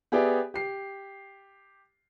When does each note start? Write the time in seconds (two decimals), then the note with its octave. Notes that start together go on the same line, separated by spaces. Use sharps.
0.12 B3 G4 G#4 D5 E5 G5
0.54 G4 C7